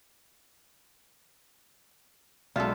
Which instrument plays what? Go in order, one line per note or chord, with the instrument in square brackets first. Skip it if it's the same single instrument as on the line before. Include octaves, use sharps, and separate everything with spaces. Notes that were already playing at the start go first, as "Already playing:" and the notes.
[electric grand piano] B1 F#3 G#3 [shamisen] C#4 A4 [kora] F4 E5 [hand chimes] D5